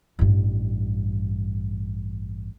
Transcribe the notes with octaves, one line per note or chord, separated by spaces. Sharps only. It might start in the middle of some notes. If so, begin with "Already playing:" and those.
A1 G2